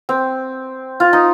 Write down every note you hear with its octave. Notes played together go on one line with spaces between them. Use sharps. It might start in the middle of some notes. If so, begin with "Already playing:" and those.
C4
F4
D#4